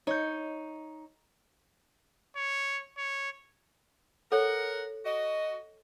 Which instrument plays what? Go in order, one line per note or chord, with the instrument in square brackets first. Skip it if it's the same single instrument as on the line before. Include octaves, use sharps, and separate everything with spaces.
[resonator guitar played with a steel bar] D#4 [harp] C#5 G6
[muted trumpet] C#5
C#5
[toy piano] A4 C#5 [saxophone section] A#4 F#5
[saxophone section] F#4 D#5